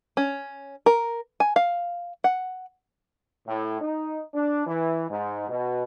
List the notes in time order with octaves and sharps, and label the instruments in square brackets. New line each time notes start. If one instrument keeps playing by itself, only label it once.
[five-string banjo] C#4
A#4
G#5
F5
F#5
[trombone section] A2
D#4
D4
E3
G#2
B2